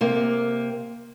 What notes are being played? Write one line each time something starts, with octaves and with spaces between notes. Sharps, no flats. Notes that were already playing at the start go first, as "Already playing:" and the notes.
C3 A#3